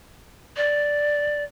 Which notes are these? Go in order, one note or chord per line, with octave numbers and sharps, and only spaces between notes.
D5